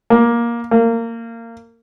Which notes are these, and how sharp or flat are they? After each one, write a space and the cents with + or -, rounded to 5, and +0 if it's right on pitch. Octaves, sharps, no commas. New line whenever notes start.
A#3 +15
A#3 -20